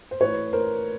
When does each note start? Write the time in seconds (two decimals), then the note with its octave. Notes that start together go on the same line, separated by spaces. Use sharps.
0.11 C5
0.20 A2 E3 A3 B4 C#5
0.53 A#4 C5